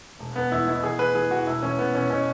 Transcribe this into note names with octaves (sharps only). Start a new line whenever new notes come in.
E1
E1 B3
E2 E4
B2 E4
E2 G#4
E2 B4
E3 G#4
E3 F#4
E1 E4
E3 C#4
E1 B3
E1 C#4
B2 C#4